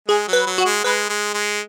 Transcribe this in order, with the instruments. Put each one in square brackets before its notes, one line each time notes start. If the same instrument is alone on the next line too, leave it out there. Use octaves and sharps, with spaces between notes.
[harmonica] G#3 [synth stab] G#4
[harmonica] F#3
[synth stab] B4
[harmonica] F#3
[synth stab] F#4
[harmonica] G#3
[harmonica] G#3 [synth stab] B4
[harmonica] G#3
G#3